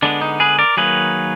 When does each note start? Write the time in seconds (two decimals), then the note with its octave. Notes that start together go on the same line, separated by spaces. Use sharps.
0.02 D3 G#3 B3 D4
0.21 D#4
0.40 G#4 B4
0.59 A#4 D5
0.77 D#3 F#3 A#3 G#4 B4